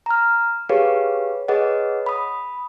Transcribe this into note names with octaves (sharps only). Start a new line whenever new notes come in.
A#5 F6
G4 G#4 B4 C#5 F5
G#4 B4 C#5 D#5 F#5
B5 D#6